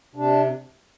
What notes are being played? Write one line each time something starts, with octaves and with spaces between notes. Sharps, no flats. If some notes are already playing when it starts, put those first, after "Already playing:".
C3 D4